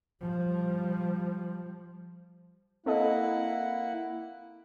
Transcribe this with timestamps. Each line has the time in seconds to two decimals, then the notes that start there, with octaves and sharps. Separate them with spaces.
0.22 F3 G3
2.86 A#3 C4 E4 A4 D#5 F#5